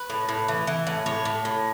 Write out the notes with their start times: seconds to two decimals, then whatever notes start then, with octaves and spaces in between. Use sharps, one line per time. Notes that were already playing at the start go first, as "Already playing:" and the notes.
Already playing: B4
0.10 A2
0.29 A2
0.48 E3
0.67 E3
0.87 A2
1.06 A2 C#5
1.25 A2
1.45 A2